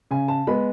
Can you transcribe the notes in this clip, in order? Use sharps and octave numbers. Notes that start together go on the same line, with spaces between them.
C#3 G#5
A5
G#3 B3 B5